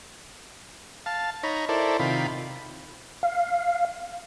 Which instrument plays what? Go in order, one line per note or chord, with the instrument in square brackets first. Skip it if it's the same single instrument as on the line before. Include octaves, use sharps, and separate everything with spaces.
[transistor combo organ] F5 A5
D#4 C#5 A#5 B5
E4 A4 A#4 C5 D5
C3 D#3 F4 B5
[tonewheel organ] F5